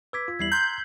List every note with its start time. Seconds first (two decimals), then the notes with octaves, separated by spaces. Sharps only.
0.13 B4 D6 E6 G#6 B6
0.28 F4
0.39 E2 G3 E4 G#6 C7 F#7
0.52 A#5 C6 F#6 G6